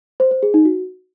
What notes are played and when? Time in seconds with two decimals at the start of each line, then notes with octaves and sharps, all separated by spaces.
0.20 C5
0.31 C5
0.43 G#4
0.54 D#4
0.65 F#4